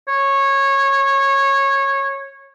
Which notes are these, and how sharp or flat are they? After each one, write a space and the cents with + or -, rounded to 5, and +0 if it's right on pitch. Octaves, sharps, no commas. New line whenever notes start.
C#5 -15